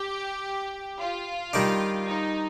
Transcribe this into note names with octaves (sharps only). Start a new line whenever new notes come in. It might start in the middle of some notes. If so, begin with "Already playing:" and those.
Already playing: G4
F4
D#3 G3 D4
D#4